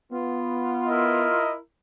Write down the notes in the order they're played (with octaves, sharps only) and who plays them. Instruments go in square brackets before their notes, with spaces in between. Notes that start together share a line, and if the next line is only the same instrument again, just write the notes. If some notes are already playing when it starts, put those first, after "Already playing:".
[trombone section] B3 [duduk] F4
[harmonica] E4 A#4 [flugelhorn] D#5